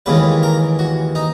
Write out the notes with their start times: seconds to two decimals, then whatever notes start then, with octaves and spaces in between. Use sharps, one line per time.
0.06 D#2 C#3 E3 G#3 B4
0.43 A#4
0.79 F#4
1.15 D#4